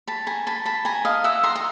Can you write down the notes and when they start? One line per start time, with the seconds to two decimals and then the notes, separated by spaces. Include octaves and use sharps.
0.07 A5 B5
0.27 G#5 A#5
0.47 A5 B5
0.65 A5 B5
0.85 G#5 A#5
1.05 D#5 F5
1.24 E5 F#5
1.43 A#5 C6
1.55 A#5